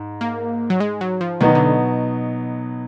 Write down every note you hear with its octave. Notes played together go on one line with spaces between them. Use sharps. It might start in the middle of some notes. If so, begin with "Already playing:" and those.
Already playing: G#2
A#3
F#3
G#3
F#3
F3
B2 D#3 F#3 B3 D#4
D3